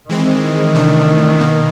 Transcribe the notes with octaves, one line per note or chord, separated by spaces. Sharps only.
D#3 E3 G#3 C4
C3 E3 A3 D4
B2 A#3